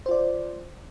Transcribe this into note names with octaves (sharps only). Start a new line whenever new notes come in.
F4 C5 D5